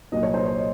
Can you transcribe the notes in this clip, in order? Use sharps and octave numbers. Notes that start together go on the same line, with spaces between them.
C2 A#2 F#3 D#5
C#5
C5
C#5
D#5